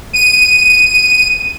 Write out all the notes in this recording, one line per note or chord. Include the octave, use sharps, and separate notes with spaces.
D#7